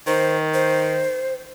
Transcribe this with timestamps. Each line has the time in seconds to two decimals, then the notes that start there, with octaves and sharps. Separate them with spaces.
0.07 D#3 C5
0.54 C5